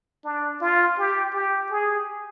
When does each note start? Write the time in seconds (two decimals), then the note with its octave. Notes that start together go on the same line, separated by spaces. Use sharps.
0.25 D4
0.61 F4
0.99 G4
1.34 G4
1.71 G#4